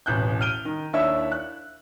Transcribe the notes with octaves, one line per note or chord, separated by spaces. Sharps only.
E1 A1 F#6 G6
F6 D7 D#7 G7
D#3
D#2 D4 E4 C#5 E5 E6
F#6